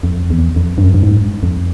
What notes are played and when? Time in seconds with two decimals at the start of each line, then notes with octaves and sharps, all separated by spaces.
0.03 F2
0.30 E2
0.56 F2
0.78 G2
0.84 F#2
0.94 G2
1.03 G#2
1.43 F2